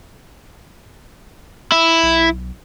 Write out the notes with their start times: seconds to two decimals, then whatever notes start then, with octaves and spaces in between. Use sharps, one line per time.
1.72 E4
2.03 B1